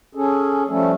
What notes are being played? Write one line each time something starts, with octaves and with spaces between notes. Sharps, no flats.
C#4 G#4 A4
F3 G3 A3 C#4 A4